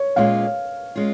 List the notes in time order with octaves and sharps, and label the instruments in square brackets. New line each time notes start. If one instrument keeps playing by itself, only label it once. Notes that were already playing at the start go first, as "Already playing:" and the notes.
Already playing: [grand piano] C#5
[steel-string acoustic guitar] A#2 G#3 C#4 F4 [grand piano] F5
[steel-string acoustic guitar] G#3 C#4 F4